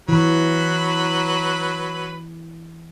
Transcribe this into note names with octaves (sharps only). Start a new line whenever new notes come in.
E3 F#3 B4 B5